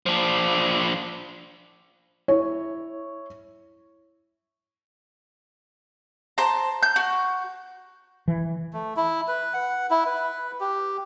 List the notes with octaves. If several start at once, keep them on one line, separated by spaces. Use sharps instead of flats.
F3 D4
E4 C#5
C5 A5 A#5
G6
F#4
E3
A3
E4
B4
F#5
E4
B4
G4